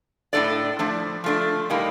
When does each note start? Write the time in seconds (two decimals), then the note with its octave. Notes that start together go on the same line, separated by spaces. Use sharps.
0.33 A2 A3 D4 A4 D5
0.79 F3 A3 D4
1.24 F3 A3 D4
1.70 A2 G3 A#3 D#4